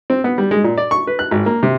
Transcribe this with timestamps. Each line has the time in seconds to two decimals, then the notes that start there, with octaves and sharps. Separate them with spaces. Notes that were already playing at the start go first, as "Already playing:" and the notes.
0.10 C4
0.24 B3
0.38 G3
0.51 G#3
0.64 A#2
0.78 D5
0.91 C#6
1.07 B4
1.19 F#6
1.31 G#1
1.46 A#3
1.63 C3